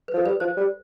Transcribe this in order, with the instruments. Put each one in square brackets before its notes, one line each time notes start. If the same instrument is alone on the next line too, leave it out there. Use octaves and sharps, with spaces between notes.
[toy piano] B4
[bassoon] F3 [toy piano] A4
[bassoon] G3 [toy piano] B4
[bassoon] F3 [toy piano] C5
[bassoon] G3